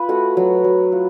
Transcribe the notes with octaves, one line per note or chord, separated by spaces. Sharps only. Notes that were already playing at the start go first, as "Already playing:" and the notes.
Already playing: F4 B4
A3 F#4
F#3
F#3
F4